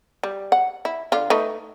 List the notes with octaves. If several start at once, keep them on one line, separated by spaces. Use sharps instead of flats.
G3
F#5
E4
D3 F4
A3 D#4 B4